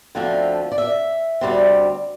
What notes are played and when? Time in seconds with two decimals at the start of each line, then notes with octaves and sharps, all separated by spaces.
0.15 D2 D3 F3 A3 C4 E5
0.72 D5
0.78 E5
1.41 D2 C3 G3 C4